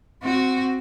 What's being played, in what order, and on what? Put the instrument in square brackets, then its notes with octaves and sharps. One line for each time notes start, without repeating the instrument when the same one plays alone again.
[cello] C4 F#4